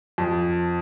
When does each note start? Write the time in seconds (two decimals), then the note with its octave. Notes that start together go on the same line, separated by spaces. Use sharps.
0.18 F2